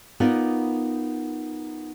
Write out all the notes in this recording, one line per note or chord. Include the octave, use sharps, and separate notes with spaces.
B3 D#4 F4 A#4 D5